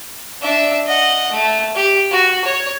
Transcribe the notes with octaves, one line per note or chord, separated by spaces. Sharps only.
D4 E5
D#5 F#5
A3
G4
F#4
C#5